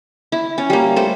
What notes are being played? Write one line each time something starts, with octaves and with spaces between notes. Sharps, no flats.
E4
C#4
G3 A#3
A3 C5